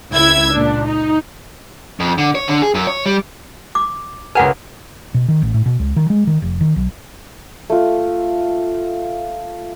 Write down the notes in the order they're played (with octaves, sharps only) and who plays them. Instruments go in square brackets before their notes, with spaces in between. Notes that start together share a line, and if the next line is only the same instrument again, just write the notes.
[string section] C#2 E4 E6 G#6
A#2 D4
D#4
[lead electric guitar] F2
D3
C#5
D3
G#4
F#2
C#5
G3
[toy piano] D6
[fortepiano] C#2 A#4 G#5 [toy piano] B4 F#5
[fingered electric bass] B2
D#3
A1
A2
B2
C#2
D#3
G#3
D#3
F1
D#3
B1
[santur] A3 F4